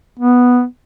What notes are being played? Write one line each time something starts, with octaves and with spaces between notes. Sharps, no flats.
B3